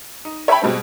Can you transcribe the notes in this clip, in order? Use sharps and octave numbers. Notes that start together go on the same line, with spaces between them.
D#4
C#5 E5 G5 A5 B5
B2 G3 G#3 C4